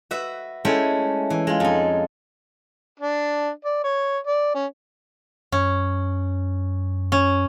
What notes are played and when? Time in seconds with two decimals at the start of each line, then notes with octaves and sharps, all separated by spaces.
0.11 F#4 B4 E5
0.65 G#3 A3 C#4 E4 G5 C6
1.30 E3
1.47 G#3 F4
1.60 F2 D#4
3.00 D4
3.65 D5
3.84 C#5
4.27 D5
4.55 C#4
5.52 F#2 C#4
7.12 C#4